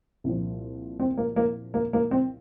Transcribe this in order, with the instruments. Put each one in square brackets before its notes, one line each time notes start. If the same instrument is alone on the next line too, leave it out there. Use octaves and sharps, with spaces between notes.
[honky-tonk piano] C2 A#2 F3
C4
A#3
A#3
A#3
A#3
C4